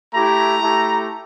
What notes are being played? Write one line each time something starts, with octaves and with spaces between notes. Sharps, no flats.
A3 E4 G4 A#5
A3 E4 G4